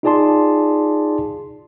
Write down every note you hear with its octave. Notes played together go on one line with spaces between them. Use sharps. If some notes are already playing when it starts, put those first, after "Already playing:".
D#4 F4 G#4 D5 A5 C6